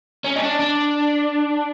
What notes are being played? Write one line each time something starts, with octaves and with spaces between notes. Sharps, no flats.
C#4
D#4
D4
D4